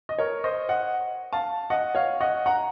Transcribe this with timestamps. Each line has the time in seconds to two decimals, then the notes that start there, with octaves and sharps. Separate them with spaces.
0.09 D#5
0.19 A#4 C#5
0.44 C5 D#5
0.69 D#5 F#5
1.33 F5 A5
1.70 D#5 F#5
1.95 C#5 F5
2.21 D#5 F#5
2.46 F#5 A#5